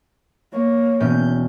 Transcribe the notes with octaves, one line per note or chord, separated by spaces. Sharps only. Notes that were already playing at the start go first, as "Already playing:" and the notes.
A#3 C#5
E1 B3 C#4 F6 G6